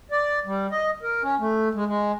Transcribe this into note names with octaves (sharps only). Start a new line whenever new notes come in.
D5
G3
D#5
A#4
C#4
A3
G#3
G#3